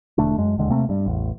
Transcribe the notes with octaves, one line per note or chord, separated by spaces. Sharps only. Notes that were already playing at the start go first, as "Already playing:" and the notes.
E1 D3 A3 D4
F#2 G#3
E1 D#2 D3 G#3
C3 A3 A#3 C4
G2 G3
A1 E2